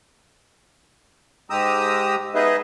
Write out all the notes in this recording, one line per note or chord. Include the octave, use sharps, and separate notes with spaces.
G#2 G#3 G4 A#5 D#6 E6
B3 D#4 G#4 B4 D#5 E5